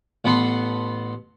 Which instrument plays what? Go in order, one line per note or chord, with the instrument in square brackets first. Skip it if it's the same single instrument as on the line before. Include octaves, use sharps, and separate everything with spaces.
[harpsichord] A1 B3 A4 F#5 B5 C6